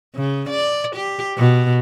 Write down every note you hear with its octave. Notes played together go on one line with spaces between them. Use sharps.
C#3
D5
G4
B2